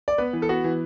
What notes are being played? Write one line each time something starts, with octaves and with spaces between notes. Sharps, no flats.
D5
B3 B4
E3
A4
B3 F#4
E3